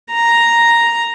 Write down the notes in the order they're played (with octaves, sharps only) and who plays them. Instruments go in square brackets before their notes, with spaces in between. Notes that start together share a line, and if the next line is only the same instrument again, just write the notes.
[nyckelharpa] A#5